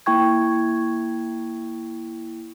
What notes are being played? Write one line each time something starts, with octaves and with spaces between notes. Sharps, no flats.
A#3 E4 G5 C#6 G#6